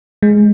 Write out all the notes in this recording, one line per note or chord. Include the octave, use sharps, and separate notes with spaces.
G#3